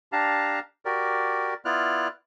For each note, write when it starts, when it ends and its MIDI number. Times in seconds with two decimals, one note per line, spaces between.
0.12 0.59 62
0.12 0.59 67
0.12 0.59 77
0.12 0.59 81
0.12 0.59 82
0.85 1.54 66
0.85 1.54 67
0.85 1.54 70
0.85 1.54 74
1.65 2.08 59
1.65 2.08 64
1.65 2.08 65
1.65 2.08 74
1.65 2.08 89
1.65 2.08 90